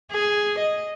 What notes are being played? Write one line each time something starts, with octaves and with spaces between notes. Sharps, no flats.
G#4
D#5